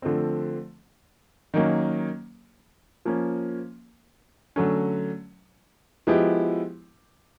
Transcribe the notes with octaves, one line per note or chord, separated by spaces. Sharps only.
D3 F3 A3 C4
D#3 F#3 A#3 C#4
F3 A#3 C#4
D3 F#3 A3 C#4
F3 G#3 B3 E4 G4